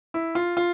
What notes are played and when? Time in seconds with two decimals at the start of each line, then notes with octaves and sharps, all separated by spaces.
0.14 E4
0.35 F4
0.57 F4